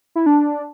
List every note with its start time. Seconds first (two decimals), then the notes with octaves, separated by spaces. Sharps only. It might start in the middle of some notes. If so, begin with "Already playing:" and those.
0.15 E4
0.26 D4